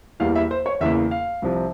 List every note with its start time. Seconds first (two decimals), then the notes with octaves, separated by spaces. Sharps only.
0.20 E2 E3 G3 A#3 F5
0.35 E5
0.51 C5
0.66 C#5
0.80 E2 C#3 E3 A#3 E5
1.11 F5
1.42 C2 C3 F3